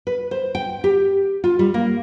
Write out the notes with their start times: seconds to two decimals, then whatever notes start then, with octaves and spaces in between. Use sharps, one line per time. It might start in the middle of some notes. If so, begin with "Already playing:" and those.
0.07 B4
0.31 C5
0.55 G5
0.84 G4
1.44 F4
1.59 G3
1.74 A#3